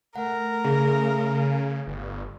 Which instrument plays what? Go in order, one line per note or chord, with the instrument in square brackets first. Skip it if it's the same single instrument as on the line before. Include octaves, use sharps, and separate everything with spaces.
[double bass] A3 [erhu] A#4 [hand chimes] F#5
[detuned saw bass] C#3 [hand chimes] G#4
[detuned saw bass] G1